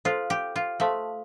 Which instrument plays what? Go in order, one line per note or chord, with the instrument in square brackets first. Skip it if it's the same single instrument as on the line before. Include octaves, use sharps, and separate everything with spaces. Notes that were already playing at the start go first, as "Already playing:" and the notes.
[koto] F4 [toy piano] A4 C5 F5 A5 C6
[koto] G4
F4
[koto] A3 [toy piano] A4 C5 F5 A5 C6